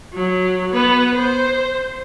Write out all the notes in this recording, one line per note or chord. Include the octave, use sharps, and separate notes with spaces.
F#3
B3 B4
C5